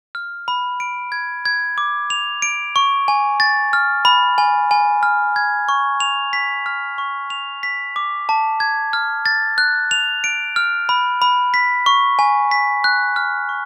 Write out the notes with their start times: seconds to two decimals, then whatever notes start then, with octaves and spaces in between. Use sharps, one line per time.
0.15 F6
0.48 B5
0.80 D7
1.12 G#6
1.45 G#6
1.78 D6
2.10 F7
2.42 D7
2.76 C#6
3.08 G#5
3.40 A6
3.73 F6
4.05 B5
4.38 G#5
4.71 G#5
5.03 F6
5.36 G#6
5.69 C#6
6.00 F7
6.33 B6
6.66 F6
6.98 C#6
7.30 F7
7.63 B6
7.96 D6
8.29 A5
8.60 G#6
8.93 F6
9.26 A6
9.58 F#6
9.91 F7
10.24 D7
10.56 F6
10.89 B5
11.22 B5
11.54 B6
11.86 C#6
12.19 G#5
12.51 B6
12.84 F#6
13.16 F6
13.49 C#6